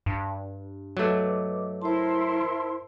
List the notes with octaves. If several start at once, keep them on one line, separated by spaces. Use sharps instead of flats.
G2
F#3 A3 B4 D#5 D6
E4 A#4 C5 A5 C6